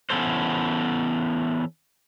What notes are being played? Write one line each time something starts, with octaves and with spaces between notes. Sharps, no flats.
E3 B3 C#4 A4 C5